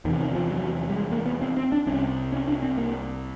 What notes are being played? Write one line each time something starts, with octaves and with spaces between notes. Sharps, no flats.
E2 C3 D#3
D#3
F3
F#3
G3
G#3
A#3
B3
C4
C4
D4
C2 C3 C#4
C#4
D4
C4
A#3